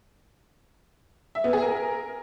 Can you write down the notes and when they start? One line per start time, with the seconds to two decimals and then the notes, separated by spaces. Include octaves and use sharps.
1.35 E5
1.44 B3
1.53 G#4
1.62 A#4